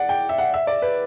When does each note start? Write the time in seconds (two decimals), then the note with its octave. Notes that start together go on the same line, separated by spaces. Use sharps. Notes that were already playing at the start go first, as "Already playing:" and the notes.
Already playing: D5 F#5
0.09 G5
0.29 E5
0.38 F#5
0.54 E5
0.67 D5
0.82 B4